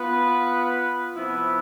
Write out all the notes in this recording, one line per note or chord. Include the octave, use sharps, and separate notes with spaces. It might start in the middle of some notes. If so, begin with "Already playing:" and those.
Already playing: B3 F4 B4
C3 F3 B3 E4 B4